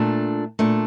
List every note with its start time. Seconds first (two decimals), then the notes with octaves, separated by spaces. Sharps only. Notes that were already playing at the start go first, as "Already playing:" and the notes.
Already playing: A#2 A3 D4
0.59 A#2 A3 D4